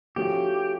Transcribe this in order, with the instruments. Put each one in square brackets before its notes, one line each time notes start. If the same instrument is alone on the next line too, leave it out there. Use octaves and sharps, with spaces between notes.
[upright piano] F3 A3 C#4 F#4 [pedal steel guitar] G4